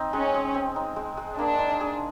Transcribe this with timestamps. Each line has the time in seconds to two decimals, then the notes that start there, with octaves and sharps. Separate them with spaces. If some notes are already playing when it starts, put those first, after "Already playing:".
Already playing: C4 D#4
0.13 G#3 C#4
0.35 G#3
0.54 C4
0.76 D#4
0.96 G#3
1.17 G#3
1.38 A#3 D4
1.59 D#4
1.81 G#4